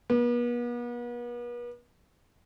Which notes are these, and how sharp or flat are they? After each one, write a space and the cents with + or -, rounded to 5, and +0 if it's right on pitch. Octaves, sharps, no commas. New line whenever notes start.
B3 -40